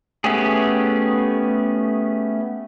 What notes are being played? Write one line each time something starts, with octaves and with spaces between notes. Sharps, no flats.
A3 B3 C#4 G4 G#4